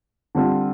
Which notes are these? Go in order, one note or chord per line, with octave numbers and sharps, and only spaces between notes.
D3 G3 C4 F4